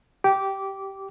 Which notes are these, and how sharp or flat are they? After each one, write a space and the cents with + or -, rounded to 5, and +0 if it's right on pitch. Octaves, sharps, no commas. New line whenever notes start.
G4 -10 D6 -15